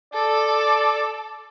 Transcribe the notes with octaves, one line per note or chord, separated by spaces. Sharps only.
A4 D5